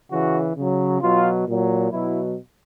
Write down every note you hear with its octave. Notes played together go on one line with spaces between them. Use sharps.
C#3 E3 F#4
C#3 F#3
B2 F#3 F4
A#2 F#3
B2 F#3 E4